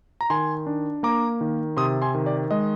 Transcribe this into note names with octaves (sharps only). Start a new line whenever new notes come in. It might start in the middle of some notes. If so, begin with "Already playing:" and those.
A#5
D#3 G#5 C6
D4
A#3 A#5 D6
D#3
C3 C6 D#6
G#5 C6
D#3
D5
G#3 D#5